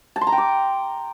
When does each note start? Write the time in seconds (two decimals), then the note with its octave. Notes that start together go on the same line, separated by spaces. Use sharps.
0.16 A5
0.21 C6
0.27 A#5
0.32 G5
0.38 D6